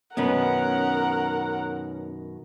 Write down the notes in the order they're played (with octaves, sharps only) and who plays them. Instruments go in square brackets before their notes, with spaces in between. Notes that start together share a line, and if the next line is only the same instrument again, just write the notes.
[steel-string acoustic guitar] F#2 B2 D#3 [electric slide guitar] B3 C#4 B4 [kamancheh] A#4 F#5